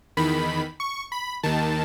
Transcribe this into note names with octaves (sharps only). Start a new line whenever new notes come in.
E2 D#3 B5
C#6
B5
D#2 D#3 A5